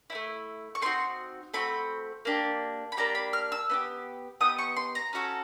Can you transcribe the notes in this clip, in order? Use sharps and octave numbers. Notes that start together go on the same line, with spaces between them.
C4 E4
A3
C#6
A3 C4 D#4 F#4 C6
A3 C4 F#4 B5
A#3 D4 G4
B5
A#3 D4 G4 A#5
B5
F6
E6
B3 D#4 G4
B3 D#4 G4 D#6
C#6
C6
A#5
C#4 F#4 A4